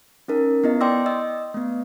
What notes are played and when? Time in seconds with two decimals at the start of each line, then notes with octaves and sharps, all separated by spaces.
0.28 C#4 D#4 A#4
0.64 B3 E4 D#5
0.80 D5 G5 C6 D6 E6 A#6
1.06 D#5 E6
1.54 A3 B3